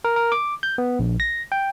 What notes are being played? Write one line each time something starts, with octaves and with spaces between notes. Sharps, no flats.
A#4
A#4
D6
G6
B3
A#1
A#6
G5